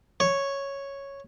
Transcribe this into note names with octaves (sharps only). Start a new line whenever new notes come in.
C#5